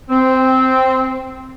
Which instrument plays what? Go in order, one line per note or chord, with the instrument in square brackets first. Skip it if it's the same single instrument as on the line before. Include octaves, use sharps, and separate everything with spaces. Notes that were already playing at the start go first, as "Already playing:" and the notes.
[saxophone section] C4